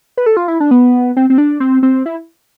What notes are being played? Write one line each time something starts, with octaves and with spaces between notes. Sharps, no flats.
B4
A4
F4
E4
D4
B3
C4
C4
D4
C4
C4
E4